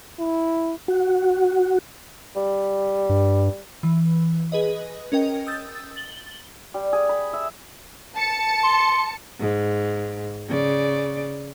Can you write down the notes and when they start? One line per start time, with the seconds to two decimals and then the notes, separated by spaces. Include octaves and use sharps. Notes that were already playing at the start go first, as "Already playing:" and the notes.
0.20 E4
0.88 F#4
2.36 G3
3.09 G2
3.83 E3
4.52 G#4 B4 D#5
5.12 C#4 A#4 D#5 G5
5.47 D#6 E6 G6 A6
5.96 A6 F#7 G7
6.74 G3
6.93 G#4
7.09 B5
7.33 E5
8.16 A5 C#7
8.63 C6
9.39 G#2
10.49 C#3 D5